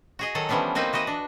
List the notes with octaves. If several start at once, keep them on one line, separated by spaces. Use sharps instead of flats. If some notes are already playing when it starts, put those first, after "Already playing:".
F#4 G#4 D#5
D#3 F#3 A4 F#5 G#5
E3 F3 G3 B3 C#4 D4
A#3 C4 D#4 F#4 B4
E3 F#4 B4 D#5
D4